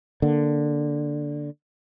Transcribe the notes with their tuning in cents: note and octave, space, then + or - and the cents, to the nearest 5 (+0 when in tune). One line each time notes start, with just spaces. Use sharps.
D3 +0 A#3 +0